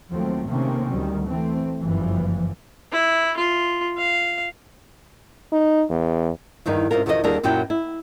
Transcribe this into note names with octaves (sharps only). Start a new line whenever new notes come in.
D#2 F3 F#3 A3 C4
C3 D#3 A3 A#3 C4 C#4
D2 D#3 F#3 G3
E3 A3 C4
F#1 G2 E3 F3
E4
F4
F5
D#4
E2
E2 G2 D#3 D#4
G#2 C3 C#4 F4 A#4
E2 B2 D#3 F3 A4 D#5
D#2 D3 G3 D4 G#4 A#4
F#2 A#2 F#3 E4 G4 G5
E4